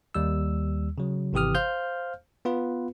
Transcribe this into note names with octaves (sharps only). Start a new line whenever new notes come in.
D#2 G3 E6
C#3 F#3
G#1 C3 E3 G4 D#6 F6
C5 F5 F6 G6
B3 F4 B4